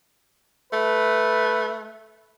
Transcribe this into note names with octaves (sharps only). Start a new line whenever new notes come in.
A3 B4